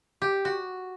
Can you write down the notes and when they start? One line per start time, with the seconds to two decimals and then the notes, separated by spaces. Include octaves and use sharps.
0.22 G4
0.45 F#4